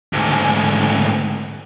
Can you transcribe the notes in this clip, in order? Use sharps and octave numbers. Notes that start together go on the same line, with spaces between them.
D2 G#2